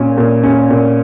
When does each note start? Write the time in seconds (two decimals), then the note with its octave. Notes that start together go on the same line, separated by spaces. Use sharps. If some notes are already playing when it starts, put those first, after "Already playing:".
Already playing: A#2 C#4
0.18 A#2
0.43 C#4
0.70 A#2